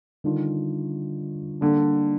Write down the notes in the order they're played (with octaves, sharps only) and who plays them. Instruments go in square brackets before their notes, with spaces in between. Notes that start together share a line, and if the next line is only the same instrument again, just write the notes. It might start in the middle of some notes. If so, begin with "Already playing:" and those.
[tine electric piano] D3 G3 D4 F4 [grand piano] D#3
[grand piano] D3 [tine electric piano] G3 A#3 D4